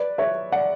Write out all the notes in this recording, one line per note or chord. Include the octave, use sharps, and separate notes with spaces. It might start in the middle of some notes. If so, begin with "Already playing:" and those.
Already playing: B4 D5
C#5 E5
D5 F#5